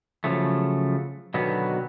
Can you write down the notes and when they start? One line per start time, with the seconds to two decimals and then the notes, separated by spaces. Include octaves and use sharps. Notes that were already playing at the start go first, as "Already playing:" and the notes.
0.24 C#3 F3 F#3 A3
1.34 B2 D3 D#3 F#3 B3